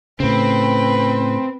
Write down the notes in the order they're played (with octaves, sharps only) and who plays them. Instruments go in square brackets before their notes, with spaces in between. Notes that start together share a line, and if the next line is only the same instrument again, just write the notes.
[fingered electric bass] A2 C#3 [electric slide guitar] C4 [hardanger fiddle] B4